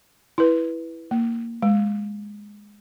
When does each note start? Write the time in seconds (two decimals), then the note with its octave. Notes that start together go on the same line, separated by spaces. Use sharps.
0.38 E4 B4
1.11 A#3
1.62 G#3